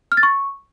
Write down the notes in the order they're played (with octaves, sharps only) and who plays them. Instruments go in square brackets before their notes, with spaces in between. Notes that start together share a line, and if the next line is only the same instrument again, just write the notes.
[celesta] F6
A6
C#6